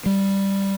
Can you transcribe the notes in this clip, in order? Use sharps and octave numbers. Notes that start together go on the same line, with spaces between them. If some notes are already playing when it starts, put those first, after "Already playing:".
G3